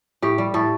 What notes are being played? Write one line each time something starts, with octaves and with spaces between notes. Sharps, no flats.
A2 G4
G3
A2 A4